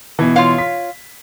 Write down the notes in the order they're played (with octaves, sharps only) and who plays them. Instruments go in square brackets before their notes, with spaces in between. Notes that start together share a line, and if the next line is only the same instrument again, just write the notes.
[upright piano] B2 E3
[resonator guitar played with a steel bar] F4 C#5 F5
[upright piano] B6